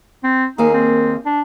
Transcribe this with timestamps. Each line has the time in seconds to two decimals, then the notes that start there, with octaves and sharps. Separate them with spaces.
0.24 C4
0.58 D#2 A#3 D#4 G#4
0.74 C4
1.26 D4